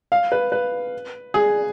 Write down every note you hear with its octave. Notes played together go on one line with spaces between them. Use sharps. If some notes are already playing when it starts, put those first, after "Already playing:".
F5
B4
B4
G#4